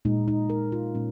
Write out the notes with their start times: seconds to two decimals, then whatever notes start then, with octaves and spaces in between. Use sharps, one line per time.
0.05 A#2 G#3 D#4
0.28 D#4
0.50 A#4
0.72 F4
0.95 A#2 G#3 C#4